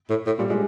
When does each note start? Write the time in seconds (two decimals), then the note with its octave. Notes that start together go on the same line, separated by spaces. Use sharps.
0.10 A2
0.26 A2
0.38 A#2 G3
0.49 A#2 G#3